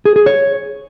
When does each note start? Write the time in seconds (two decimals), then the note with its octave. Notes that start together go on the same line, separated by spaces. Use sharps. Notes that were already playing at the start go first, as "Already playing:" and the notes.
0.05 G#4
0.16 G#4
0.26 C#5